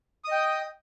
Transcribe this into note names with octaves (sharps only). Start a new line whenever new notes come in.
D#5 G5 D#6